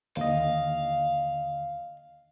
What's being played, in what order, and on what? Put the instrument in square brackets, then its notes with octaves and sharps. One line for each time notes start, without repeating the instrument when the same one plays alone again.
[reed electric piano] D#2 D3 D#5 [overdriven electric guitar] F5